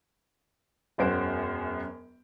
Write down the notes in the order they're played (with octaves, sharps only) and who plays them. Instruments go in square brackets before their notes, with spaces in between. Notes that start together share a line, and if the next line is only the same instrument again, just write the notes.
[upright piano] E1 F#2 C#4 F#4 C5 D7